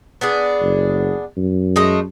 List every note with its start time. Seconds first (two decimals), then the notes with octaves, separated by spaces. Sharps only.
0.21 B3 D4 G#4
0.61 F#1
1.37 F#2
1.76 G#3 A3 D#5